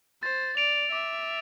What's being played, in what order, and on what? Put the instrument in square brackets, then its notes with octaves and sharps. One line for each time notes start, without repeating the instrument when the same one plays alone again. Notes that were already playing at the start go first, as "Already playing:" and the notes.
[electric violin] C5 [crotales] A6
[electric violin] D5 [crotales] D7 F7
[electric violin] E5 [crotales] D6